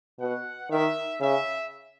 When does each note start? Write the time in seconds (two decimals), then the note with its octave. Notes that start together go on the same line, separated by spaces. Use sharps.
0.20 B2 F#5
0.70 D#3 E5
1.20 C#3 E5